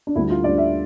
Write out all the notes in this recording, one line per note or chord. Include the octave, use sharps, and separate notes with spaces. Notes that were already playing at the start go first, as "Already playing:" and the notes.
D4
D2 D3 G3 E4
F4
D2 D3 G3 D5
E5